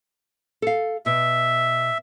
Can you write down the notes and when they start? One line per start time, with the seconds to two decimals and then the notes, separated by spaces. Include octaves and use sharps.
0.62 A4 F5
1.06 B2 E5